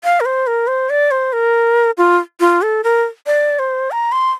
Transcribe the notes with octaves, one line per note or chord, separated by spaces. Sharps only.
F5
A#4
C5
A#4
C5
D5
C5
A#4
F4
F4
A4
A#4
D5
C5
A#5
C6